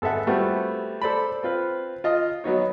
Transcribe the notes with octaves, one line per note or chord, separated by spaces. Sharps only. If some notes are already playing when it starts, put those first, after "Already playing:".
G#1 A4 B4 E5 F#5
G3 A3 B3 C4 F4 F#4
A4 C5 D5 B5
C4 F4 B4
F4 D#5 D#6
F#3 B3 D#4 C#5